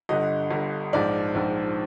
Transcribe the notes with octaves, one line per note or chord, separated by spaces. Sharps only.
G1 G2 D3 D#5
G1 G2 D3
A#1 G#2 F3 D5
A#1 G#2 F3